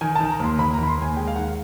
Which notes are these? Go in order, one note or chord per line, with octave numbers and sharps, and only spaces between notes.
D#3 G#5
A5
D#3
A#5
D#2 C6
D#2 B5
A#5
D#3
B5
C6
D#2 G#5
G#3 G5
F5
D#3 F#5